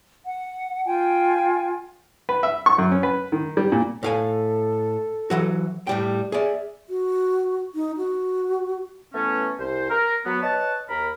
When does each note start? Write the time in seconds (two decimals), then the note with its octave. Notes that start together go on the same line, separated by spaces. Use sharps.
0.24 F#5
0.85 F4 G5 G#5
2.29 B4
2.43 E5
2.66 C#6
2.78 F#2
2.92 C#4
3.03 B4
3.32 D#3
3.57 G3
3.72 A#2
4.03 A2 A4 F5 G#5
5.30 E3 F#3 F#4
5.87 A2 G3 G5
6.32 G#4 D5 E5
6.90 F#4
7.75 D#4
7.97 F#4
9.14 E3 A3 B3 C#4
9.60 C2 C5
9.90 A#4
10.26 F#3 B3
10.43 B4 C#5 D#5 F#5 A5
10.89 D#2 A#4 B5